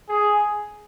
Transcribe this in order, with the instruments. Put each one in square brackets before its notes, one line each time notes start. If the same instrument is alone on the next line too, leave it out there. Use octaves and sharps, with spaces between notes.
[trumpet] G#4